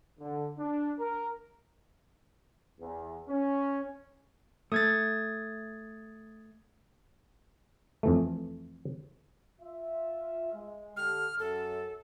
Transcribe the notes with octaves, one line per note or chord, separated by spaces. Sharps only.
D3
D4
A#4
E2
C#4
A3 D#6 G#6 A6
F2 E3 A3
F4 E5
G#3
D3 G4 A4 F6
F#2 A4